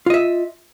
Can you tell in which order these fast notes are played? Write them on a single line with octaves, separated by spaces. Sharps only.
F4 D#5 E5